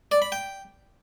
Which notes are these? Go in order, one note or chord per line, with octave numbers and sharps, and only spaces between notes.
D5
B5
G5